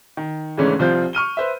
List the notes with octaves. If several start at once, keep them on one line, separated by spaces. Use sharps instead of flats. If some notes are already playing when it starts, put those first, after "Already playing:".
D#3
G#2 C#3 E3 A3 C#4 D4
C2 F3 C4 F4 G6
C#6 F6 D#7 G7
B4 C5 E5